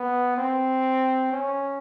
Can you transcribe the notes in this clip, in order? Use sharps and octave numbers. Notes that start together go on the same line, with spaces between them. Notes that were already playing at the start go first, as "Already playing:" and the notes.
Already playing: B3
C4
C#4